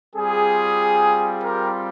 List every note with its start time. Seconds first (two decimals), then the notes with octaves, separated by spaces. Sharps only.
0.15 G3 C4 F4 G#4
1.43 G4 A#4